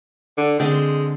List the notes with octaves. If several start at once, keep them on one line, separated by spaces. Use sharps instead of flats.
D3
D3 G#3 C4
C5